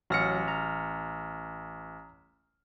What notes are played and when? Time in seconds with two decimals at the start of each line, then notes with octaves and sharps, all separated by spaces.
0.10 A1 F#3 F6 A#6 C#7
0.48 A#5